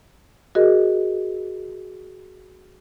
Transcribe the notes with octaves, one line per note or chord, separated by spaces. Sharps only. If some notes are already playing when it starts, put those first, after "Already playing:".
F#4 G#4 A#4 D#5